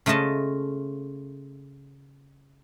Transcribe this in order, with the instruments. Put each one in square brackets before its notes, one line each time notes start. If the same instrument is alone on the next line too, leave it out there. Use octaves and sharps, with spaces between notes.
[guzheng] C#3 A3 F4 D#5 A5